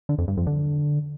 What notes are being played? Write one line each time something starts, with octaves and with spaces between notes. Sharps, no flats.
D3
F2
G2
F2
D3